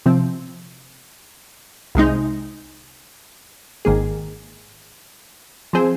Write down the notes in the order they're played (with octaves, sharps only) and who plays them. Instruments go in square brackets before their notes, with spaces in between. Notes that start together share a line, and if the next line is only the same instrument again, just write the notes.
[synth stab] C3 F3 C4
C2 C3 G#3 D#4
G#1 G#2 D#3 A#3 G#4
F3 C4 G#4 C5